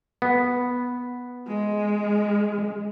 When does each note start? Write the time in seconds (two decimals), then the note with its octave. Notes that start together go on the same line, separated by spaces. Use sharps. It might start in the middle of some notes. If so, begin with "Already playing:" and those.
0.22 B3
1.47 G#3